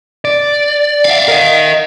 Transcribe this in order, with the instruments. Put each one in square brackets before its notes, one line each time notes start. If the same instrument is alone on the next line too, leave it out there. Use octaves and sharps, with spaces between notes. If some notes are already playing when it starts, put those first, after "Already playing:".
[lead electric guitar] D5
[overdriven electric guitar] E5 F5
[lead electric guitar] A#4 D#5